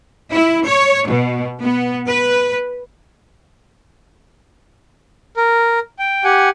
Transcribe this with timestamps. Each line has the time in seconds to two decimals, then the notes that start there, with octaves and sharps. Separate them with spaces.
0.34 E4
0.65 C#5
1.09 B2
1.62 B3
2.08 B4
5.37 A#4
5.99 G5
6.24 G4 F#5 G#5